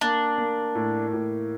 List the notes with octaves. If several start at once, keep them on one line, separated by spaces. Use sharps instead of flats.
A#3 D4
A#3
A2
A2